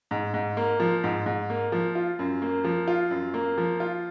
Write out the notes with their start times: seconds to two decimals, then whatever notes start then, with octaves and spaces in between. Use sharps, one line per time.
0.11 G#2
0.34 G#2
0.57 A#3
0.80 F3
1.04 G#2
1.26 G#2
1.50 A#3
1.72 F3
1.95 F4
2.19 F#2
2.42 A#3
2.64 F3
2.88 F4
3.11 F#2
3.34 A#3
3.58 F3
3.80 F4